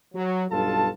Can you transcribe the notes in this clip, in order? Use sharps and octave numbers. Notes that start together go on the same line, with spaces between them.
F#3
B1 G2 F4 A4 A5